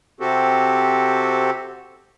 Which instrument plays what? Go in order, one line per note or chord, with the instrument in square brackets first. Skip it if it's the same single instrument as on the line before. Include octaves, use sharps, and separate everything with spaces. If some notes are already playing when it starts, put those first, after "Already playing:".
[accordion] C3 C4 F#4 G4 A4